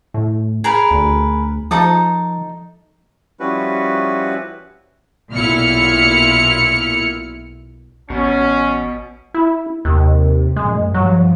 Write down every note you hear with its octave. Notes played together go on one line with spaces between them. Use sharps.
A2
G#4 A#4 B4
D2
F3 D#4 A4 D#6
F3 G3 C#4 E4 F#4 B4
B1 A#2 E4 F6 C#7
A1 B2 C#4
E4
D#2 C3
A#1 F#2 A2 G#3
G2 F3 F#3